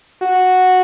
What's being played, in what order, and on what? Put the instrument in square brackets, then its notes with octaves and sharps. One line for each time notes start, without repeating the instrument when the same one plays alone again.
[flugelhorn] F#4